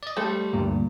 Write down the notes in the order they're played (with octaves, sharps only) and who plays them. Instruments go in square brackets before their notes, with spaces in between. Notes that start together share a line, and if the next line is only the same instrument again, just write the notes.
[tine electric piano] D5 D#5
[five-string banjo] G3 A3 A4 [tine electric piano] C5
[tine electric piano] D2 G2 A#2